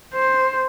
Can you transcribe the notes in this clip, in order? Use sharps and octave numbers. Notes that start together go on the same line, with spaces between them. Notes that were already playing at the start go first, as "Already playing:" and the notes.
C5